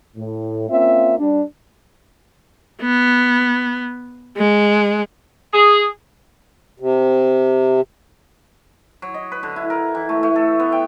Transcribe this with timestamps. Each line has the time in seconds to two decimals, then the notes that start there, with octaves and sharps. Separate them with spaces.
0.16 A2
0.69 A#3 C4 C#4 F4 E5
1.19 G3 D4
2.82 B3
4.37 G#3
5.52 G#4
6.80 C3
9.02 F#3
9.14 D#5
9.32 B4
9.43 D3
9.56 E4
9.70 A#4
9.95 E3
10.09 A3
10.23 A3
10.36 A4
10.60 B3
10.72 G5